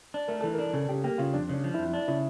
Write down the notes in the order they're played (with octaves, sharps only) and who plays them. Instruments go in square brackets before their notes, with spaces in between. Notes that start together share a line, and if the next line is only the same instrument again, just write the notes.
[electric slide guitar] D4
[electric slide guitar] A3 [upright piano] A#4
[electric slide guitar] E3 [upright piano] A4
[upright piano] A#4
[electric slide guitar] D4
[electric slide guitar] C#3 [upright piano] A4
[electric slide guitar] C#3 [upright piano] G4
[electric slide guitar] A#3 [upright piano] G4
[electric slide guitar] C#3 [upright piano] F4
[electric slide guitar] F2 [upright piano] D4
[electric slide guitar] C#3 [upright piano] D4
[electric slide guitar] F3
[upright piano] E4
[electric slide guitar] F2
D4
[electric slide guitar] C#3 [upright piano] E4